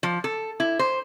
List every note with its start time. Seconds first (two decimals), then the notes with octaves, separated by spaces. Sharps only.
0.03 F3
0.24 A4
0.60 E4
0.79 C5